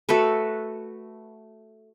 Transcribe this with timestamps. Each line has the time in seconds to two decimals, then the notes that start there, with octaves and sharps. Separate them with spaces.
0.09 A3 F#4 A4 B4